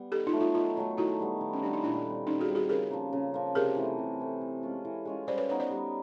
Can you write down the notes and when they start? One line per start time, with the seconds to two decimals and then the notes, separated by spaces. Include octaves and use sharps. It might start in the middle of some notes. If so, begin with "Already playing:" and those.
Already playing: G3 B3
0.12 D#3 G4 A4
0.27 D#4 F4
0.33 F#3 A3
0.40 D#4 F4
0.54 D#3 D#4 F4
0.77 F#3 A3
0.97 D#3 E4 F#4
1.19 G3 B3
1.41 D#3
1.53 C#4
1.62 G3 B3 D4
1.73 D#4
1.83 A#2 D4 E4
2.05 G3 C4
2.27 A#2 C#4 D#4
2.40 F#4 G#4
2.48 G3 C4
2.55 F#4 G#4
2.69 C#3 G#4 A#4
2.91 F3 A#3
3.13 C#3
3.34 F3 A#3
3.55 C3 G#4 A#4
3.76 E3 A3 C4
3.99 C3
4.20 E3 A3 C4
4.41 E3
4.63 G#3 C#4 F4
4.85 E3
5.05 G#3 C#4 F4
5.27 G3 C5 D5
5.38 B4 C#5
5.49 B3 D#4 F#4 B4 C#5
5.59 C5 D5
5.70 G3